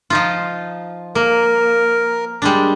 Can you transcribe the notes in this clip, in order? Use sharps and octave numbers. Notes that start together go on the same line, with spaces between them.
F3 D#4 F4
A#3 A#4
G3 G#3 D4